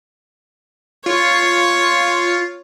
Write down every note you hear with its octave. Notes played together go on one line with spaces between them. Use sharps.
F4 C#5